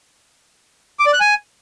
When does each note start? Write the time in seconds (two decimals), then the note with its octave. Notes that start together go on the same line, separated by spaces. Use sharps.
0.99 D6
1.06 D5
1.13 F#6
1.20 G#5